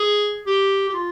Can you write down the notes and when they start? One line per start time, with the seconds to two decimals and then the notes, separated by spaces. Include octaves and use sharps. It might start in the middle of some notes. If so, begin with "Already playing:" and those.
Already playing: G#4
0.46 G4
0.89 G4
0.94 F4